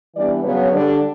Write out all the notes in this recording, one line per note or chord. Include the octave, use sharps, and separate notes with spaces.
E3 G3 B3 D4 D5
C#3 F#3 B3 C#5
D3 G3 D4